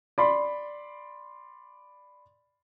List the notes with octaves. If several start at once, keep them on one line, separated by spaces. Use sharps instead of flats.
D5 B5 C6